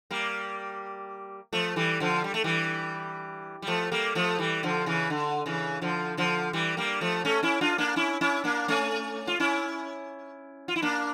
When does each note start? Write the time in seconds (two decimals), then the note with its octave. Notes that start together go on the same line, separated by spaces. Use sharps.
0.11 G3 A#3
1.53 F3 A3
1.76 E3 G3
2.00 D3 F3
2.24 G3
2.34 A3
2.44 E3 G3
3.62 G3
3.67 F3 A3
3.92 G3 A#3
4.15 F3 A3
4.38 E3 G3
4.63 D3 F3
4.86 C#3 E3
5.10 D3
5.46 C#3 E3
5.82 D3 F3
6.17 D3 F3
6.53 E3 G3
6.77 G3 A#3
7.01 F3 A3
7.25 A3 C#4
7.43 C#4 E4
7.61 D4 F4
7.78 A#3 D4
7.96 C#4 E4
8.21 C#4 E4
8.44 A#3 D4
8.68 A3 C#4
9.27 F4
9.40 C#4 E4
10.68 F4
10.76 E4
10.82 A#3 D4